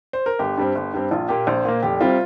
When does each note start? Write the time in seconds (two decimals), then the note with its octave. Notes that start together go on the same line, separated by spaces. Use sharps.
0.13 C5
0.26 A#4
0.39 G1 G4
0.57 G2 G3 C4
0.75 G1
0.93 G2 G3 C4
1.11 A#1 F4
1.29 A#2 A#3 G4
1.47 A#1 C5
1.65 A#2 A#3
1.83 F1 G4
2.01 C3 G3 C4 F4